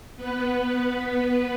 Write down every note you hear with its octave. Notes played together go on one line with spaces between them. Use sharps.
B3 B4